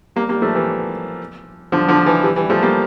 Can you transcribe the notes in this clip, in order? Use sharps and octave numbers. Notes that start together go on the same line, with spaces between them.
G3 A#3
G3 A#3
F3 A3
E3 G3
D3 F3
D3 F3
E3
E3 G3
E3 G3
F3 A3
G3 A#3